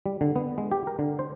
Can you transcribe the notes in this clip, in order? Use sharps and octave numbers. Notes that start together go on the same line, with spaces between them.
G3
D3
B3
G#3
G4
A#4
D3
C5